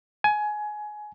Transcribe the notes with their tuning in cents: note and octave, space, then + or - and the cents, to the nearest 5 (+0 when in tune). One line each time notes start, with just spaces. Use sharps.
G#5 +20